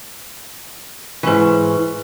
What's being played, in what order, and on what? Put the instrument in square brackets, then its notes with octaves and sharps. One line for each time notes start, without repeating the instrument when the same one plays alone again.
[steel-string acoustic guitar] G#2 E3 [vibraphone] E4 B4 C#6